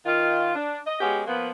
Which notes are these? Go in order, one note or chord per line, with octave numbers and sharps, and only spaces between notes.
D#3 F4
D4
D#5
G#3 B3 C#4 F#4 G4
F3 A#3 B3